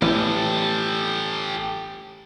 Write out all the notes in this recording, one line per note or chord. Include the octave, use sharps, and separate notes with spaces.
A1 E3 G4 A4